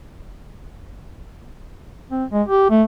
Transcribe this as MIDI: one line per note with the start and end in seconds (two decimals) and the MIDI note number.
2.10 2.24 60
2.32 2.42 56
2.48 2.69 67
2.70 2.83 57